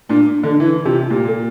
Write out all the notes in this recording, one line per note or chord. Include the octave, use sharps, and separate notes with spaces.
A#2 D4
D3
D4
E3 E4
C3 F4
A#2 G4
A4